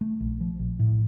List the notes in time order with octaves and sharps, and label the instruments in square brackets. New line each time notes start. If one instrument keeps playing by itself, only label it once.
[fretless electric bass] A3
A#1
F3
A#1
A2